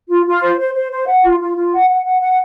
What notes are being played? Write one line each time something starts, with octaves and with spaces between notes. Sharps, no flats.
F4
F4
C5
C5
C5
C5
F#5
F4
F4
F4
F#5
F#5
F#5
F#5